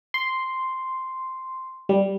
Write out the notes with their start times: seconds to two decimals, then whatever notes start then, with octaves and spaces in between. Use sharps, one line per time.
0.14 C6
1.89 G3